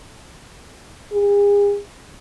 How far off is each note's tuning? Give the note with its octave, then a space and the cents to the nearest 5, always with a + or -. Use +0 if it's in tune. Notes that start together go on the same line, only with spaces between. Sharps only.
G#4 -40